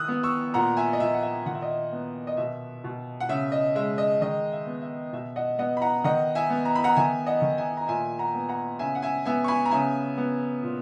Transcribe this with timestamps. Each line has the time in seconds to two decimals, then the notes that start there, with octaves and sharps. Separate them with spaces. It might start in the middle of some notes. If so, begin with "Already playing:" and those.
Already playing: D#3 D#6 E6 F#6
0.08 B3
0.23 C#6 E6
0.54 A#2 F#5 A#5
0.77 E5 G#5
0.93 D#5
1.00 A#2 E5
1.14 F#5
1.23 E5
1.46 D#3 F#5
1.55 E5
1.62 D#5
1.70 E5
1.92 B3
2.27 D#5
2.37 B2 E5
2.84 B2
3.20 F#5
3.29 C#3 E5
3.52 D#5
3.75 G#3 E5
3.98 D#5
4.21 D#3 D#5
4.52 E5
4.67 B3
4.82 E5
5.13 B2 E5
5.36 D#5 F#5
5.59 B3 D#5 F#5
5.77 B5
5.82 F#5 A#5
6.04 D#3 D#5 F#5
6.35 E5 G#5
6.50 B3
6.65 A#5
6.75 B5
6.84 F#5 A#5
6.97 D#3 E5 G#5
7.26 D#5 F#5
7.42 D#3
7.58 E5 G#5
7.77 A#5
7.88 A#2 E5 G#5
8.19 F#5 A#5
8.35 B3
8.49 F#5 A#5
8.79 C#3 E5 G#5
8.95 F#5
9.02 E5 G#5
9.25 B3 E5 G#5
9.44 C#6
9.48 G#5 B5
9.65 A#5
9.71 C#3 E5 G#5
10.17 B3
10.63 A#2